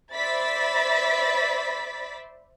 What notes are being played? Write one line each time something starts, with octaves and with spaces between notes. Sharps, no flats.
C5 D5 E5 B5 A6 B6